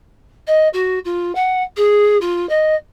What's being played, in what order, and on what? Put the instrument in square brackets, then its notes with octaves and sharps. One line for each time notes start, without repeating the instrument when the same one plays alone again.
[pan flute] D#5
F#4
F4
F#5
G#4
F4
D#5